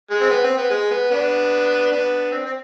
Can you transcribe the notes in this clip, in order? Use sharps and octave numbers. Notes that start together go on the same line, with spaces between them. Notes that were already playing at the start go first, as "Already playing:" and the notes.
G#3
C4
B3
C4
B3
G#3
B3
B3 D4
B3 D4
C4
C4